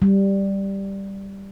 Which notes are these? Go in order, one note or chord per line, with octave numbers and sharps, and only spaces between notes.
G3